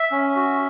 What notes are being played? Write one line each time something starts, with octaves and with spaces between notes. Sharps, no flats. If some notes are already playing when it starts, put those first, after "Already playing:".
Already playing: E5
C#4
F#4